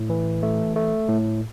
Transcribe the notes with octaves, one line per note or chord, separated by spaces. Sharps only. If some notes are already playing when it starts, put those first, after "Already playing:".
Already playing: A2
E3
A3
A3
A2